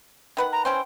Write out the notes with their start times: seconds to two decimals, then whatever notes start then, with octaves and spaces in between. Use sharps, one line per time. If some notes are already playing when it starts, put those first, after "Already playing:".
0.37 D#3 B4 F#5
0.52 A#5
0.65 E3 C#4 C5 G5